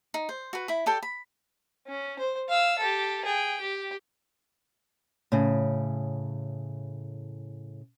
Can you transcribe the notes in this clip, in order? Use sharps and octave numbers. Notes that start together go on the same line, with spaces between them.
D#4
C5
F#4 B4
E4 B5
G4 A4 D5 G5
B5
C#4
C5
F5 E6
G4 A4
G#4 G5
G4
A2 C#3